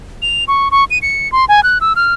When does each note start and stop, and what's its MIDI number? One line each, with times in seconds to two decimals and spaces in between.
0.22 0.44 101
0.48 0.68 85
0.71 0.84 85
0.90 0.98 99
1.02 1.30 97
1.32 1.45 84
1.49 1.63 80
1.63 1.78 90
1.81 1.93 88
1.96 2.14 89